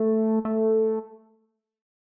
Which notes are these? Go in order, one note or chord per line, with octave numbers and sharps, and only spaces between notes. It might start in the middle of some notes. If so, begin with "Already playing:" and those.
Already playing: A3
A3